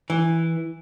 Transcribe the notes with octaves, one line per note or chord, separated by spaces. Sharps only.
E3